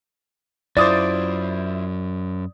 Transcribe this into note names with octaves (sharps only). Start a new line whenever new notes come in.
F#2 E4 F4 C5 D5 D#6 A6